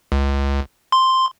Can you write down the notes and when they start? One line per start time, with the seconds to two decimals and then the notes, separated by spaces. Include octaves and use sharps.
0.12 C#2
0.92 C6